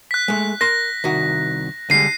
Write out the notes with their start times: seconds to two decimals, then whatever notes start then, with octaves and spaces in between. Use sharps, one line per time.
0.11 F#6 B6
0.28 G#3 A3
0.61 A#4 C6 A#6
1.04 C2 D#3 F#4
1.90 D3 G3 G#3 C7 D#7